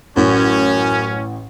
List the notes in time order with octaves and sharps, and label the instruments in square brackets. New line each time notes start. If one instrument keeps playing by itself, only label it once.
[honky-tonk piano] A1 [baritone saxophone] F#2 [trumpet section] C#4